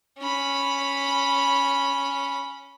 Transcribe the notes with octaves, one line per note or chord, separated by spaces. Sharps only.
C#4 B5